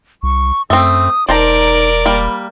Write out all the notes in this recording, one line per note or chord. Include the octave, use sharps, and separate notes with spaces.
C2 C#6
F#2 A3 C4 D#6
E1 D#4 A#4 C5 D5 A5 A#5
G3 A#3 B5